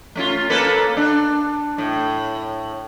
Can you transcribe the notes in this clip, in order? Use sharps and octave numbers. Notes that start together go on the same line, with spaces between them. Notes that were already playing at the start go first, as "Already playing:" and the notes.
A3 C#4 F4
A#3 A4 B4
D4
A2